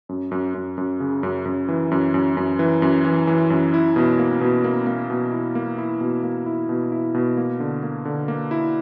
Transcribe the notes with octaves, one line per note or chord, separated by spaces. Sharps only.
F#2
F#2
F#2
F#2
C#3
F#2
F#2
E3
F#2
F#2
F#2
E3
F#2
E3
E3
F#2
E4
B2
A#3
B2
A#3
A#3
B2
E4
A#3
E4
B2
A#3
E4
B2
E4
B2
A#3
D3
A#3
D3
A#3
E4